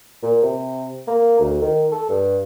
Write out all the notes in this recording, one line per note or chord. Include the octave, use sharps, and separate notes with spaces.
A#2
C3
A#3
D2
D#3
A4
G2